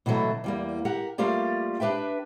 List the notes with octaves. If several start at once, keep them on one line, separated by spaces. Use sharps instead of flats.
B2 D3 E3 F#3 A3
E2 G3 A#3
G4 A#4 F#5
G3 A3 A#3 F4 G4 D5
D4 G4 B4 E5 G5